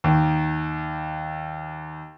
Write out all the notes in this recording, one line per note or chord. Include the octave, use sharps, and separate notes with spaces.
D#2 D#3